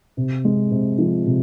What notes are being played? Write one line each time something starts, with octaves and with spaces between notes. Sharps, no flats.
C3
G#3
C3
F3
C3